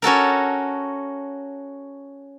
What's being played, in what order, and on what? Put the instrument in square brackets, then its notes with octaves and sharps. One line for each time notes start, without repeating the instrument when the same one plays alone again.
[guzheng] C#4 F#4 A4 A#4